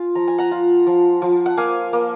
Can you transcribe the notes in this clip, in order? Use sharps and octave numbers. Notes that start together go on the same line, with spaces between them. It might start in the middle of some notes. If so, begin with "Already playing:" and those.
Already playing: F4 G#5
F3 A#5
G#5
F#5 A#5
F4
F3
F3
F#5
A#3 F5 G#5
A#3